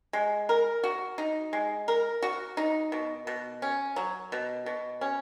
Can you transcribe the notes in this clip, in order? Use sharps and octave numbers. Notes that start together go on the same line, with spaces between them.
G#3
A#4
F#4
D#4
G#3
A#4
F#4
D#4
B2
B2
C#4
F#3
B2
B2
C#4